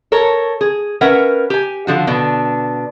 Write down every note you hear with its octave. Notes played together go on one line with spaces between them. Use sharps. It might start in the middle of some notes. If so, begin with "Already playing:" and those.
A4 A#4 C#5
G#4
C#4 A#4 B4 E5 F#5
G4 G#5
D3 F3 F#4
B2 D3 D4